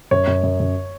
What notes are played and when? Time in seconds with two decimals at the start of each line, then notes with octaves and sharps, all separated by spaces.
0.11 F#2 C#5
0.28 F#2
0.44 F#2
0.60 F#2